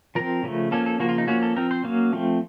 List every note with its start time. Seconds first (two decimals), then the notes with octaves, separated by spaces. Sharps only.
0.15 F3 C4 A#4
0.43 C#3 F3 A3
0.71 F3 A#3 C#4 A4
0.86 A4
1.00 C#3 F3 A#3 F#4
1.09 F4
1.18 D#4
1.27 F3 A#3 C#4 F#4
1.43 A4
1.56 F3 C4 A#4
1.71 C5
1.84 F#3 A#3 C#4 F5
2.13 F3 A3 C4